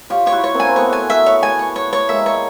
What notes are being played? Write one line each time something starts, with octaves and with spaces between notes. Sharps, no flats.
F4 G4 C#5
G4 C#5
E4 F#4
C#5
A#3 C4
G#5
C4
A3 B3 C#5
G#5
E5
C#5
G#5
C#5
C#5
C#5
G#3 A#3 E5
C#5